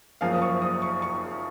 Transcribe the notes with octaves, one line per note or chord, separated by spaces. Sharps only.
F#1 F#2 F3 A#3 F5
D#6
C#6
D#6
C#6
C#6